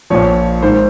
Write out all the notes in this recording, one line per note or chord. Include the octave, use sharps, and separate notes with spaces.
A#1 A#2 F3 C#5
G#1 G#2 D#3 C5